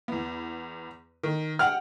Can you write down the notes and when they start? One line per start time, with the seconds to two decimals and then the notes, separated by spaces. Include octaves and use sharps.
0.08 E2 B3
1.23 D#3
1.59 F#5 G5 F6